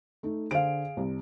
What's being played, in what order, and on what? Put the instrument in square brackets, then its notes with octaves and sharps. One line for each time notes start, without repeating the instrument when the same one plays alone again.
[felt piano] A3 D#4
[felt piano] D3 C5 D7 [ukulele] G#4 F5
[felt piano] C2